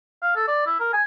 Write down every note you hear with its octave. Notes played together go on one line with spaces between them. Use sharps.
F5
A4
D5
E4
A#4
G#5